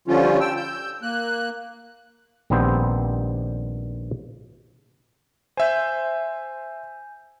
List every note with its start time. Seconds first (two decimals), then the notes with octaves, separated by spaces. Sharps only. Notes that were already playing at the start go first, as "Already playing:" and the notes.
0.08 D3 F3 G3 C#4 F4
0.40 G5 E6
0.57 E6 G6
1.02 A#3 F#6
2.50 A#1 D#3 G3 B3 C4 C5
5.57 C5 E5 G#5 G6